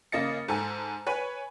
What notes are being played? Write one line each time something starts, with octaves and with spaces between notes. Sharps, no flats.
C#3 A#3 D#5 A6 C#7
G#2 A4 G#5 A#5
B4 C#5 G#5